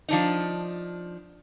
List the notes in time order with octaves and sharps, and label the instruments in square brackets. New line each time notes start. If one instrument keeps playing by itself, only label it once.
[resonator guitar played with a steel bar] F3 D4 D#4